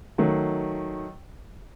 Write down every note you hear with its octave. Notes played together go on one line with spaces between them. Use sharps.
D#3 F#3 A3